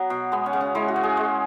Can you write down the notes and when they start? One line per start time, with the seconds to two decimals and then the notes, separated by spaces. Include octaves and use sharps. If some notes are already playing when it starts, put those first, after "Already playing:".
Already playing: F#3 B3
0.10 B2
0.32 G#3 B3
0.46 C#4
0.53 C#3
0.61 C#4
0.75 G#3 E4
0.88 F#4
0.96 C#3
1.03 G#4
1.17 G#3